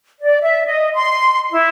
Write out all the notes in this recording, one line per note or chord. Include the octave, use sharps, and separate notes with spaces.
D5
E5
D#5
C6
E4